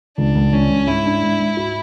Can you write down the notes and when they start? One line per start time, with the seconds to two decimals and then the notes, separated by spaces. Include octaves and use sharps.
0.18 C#2 D4
0.35 C#2
0.52 C#2 C#4
0.70 C#2
0.87 G#2 E4
1.06 D4
1.23 G#2
1.40 G#2
1.57 F#4